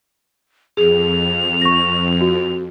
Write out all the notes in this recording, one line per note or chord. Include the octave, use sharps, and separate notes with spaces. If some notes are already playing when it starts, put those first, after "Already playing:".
F2 G#4 F7
C#6 A#6
F#4